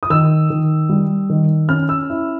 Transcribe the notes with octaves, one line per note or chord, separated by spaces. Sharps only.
D#6
D#3 E6
D#3
G3
D#3
C#4 F6
E6
E4